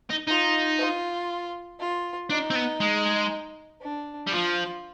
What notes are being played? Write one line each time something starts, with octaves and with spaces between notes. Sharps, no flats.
D#4
D#4 F4
F4
F4
D4 D#4
C4
B3
G#3
D4
G3
F3 F4